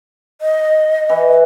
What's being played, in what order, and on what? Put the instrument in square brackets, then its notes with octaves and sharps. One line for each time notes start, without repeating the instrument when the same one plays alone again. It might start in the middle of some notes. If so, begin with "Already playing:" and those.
[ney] D#5
[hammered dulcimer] E3